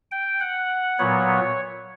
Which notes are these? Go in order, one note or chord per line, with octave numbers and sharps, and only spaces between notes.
G5
F#5
A#2 F#3 B3 C#5